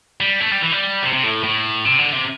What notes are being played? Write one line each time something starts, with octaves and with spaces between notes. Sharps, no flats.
G3
A3
G3
E3
G3
C3
C3
A2
A2
C3
D3
C3